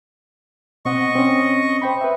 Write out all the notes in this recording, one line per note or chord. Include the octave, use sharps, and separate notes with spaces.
B2 C4 D#5 F#5 C#6
C4 C#4
C5 G5 B5
B4 E5